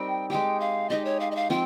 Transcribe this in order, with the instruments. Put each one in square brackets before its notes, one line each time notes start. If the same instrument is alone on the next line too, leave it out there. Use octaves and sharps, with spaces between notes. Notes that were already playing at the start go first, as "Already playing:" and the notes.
Already playing: [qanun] G3 C4 D#4 A#4 [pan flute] G5
[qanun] G#3 D#4 G4 [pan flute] G5
[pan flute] F5
[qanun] G#3 D#4 G4 [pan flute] D#5
[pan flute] C#5
F5
D#5
F5
[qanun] F3 C4 [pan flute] G5